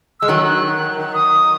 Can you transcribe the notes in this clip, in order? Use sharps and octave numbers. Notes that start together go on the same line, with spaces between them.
G#3 E6
D#3 F#3 F#6
D#6